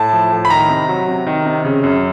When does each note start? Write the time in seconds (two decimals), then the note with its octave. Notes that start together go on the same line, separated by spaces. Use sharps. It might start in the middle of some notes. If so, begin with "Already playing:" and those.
Already playing: A2 A5
0.13 F3
0.32 A2
0.45 B5
0.50 D#3 A#5
0.69 C3
0.89 F#3
1.08 C3
1.27 D#3
1.46 C3
1.64 C#3
1.83 F#2